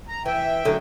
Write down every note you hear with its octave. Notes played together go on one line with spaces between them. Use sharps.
A#5
E3 E5 G5
F#2 A2 D3